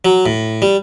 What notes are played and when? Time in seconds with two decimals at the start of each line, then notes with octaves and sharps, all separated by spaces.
0.05 F#3
0.26 A2
0.62 G3